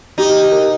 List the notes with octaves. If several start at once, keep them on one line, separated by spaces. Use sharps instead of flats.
D#4 G4
G4
A#4